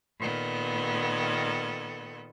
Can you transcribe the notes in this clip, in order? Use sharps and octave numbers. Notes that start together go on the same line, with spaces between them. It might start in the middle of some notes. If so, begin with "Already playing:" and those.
A#2 D#3 B3 A4